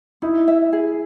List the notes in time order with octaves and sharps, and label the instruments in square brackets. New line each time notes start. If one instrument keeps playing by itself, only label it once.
[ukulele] D#4 [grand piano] E4
[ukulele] E5
G#4